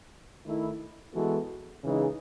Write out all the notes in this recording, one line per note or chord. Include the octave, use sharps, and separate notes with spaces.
D#3 A3 E4
E3 G#3 B3 F#4 A4
C#3 E3 G#3 D#4